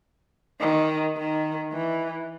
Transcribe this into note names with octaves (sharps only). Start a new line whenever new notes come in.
D#3
D#3
E3